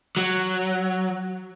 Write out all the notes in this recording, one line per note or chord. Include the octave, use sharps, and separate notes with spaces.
F#3